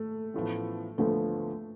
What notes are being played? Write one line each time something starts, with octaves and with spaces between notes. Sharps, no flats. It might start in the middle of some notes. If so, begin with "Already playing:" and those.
Already playing: A3
A1 A2 F3 B3
D2 D3 F3 A3 B3